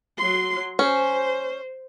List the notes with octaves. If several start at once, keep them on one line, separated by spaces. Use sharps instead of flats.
F#3 C6
C#4 C5